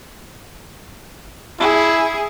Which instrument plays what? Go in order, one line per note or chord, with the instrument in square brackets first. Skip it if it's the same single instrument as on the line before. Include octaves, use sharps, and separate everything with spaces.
[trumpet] E4 [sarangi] G#4